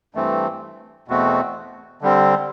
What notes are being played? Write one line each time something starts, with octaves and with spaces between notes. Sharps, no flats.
G2 E3 A3 C4
E2 B2 A3 C4 F#4
D3 G3 C4